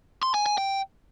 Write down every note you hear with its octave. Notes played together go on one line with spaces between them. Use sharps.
C6
G#5
G#5
G5